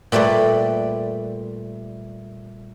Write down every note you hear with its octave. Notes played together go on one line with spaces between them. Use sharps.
A#2 G3 A3 B4 D5